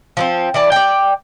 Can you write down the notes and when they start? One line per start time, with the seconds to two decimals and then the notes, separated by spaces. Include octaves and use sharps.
0.17 F3 B3 C4
0.54 E3 D5 A5
0.72 D5 G5